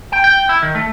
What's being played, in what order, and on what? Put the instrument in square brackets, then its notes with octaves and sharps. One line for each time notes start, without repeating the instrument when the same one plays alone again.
[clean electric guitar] G5
G5
E4
D#3
A3